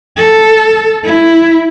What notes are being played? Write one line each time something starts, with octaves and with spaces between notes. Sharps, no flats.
A4
E4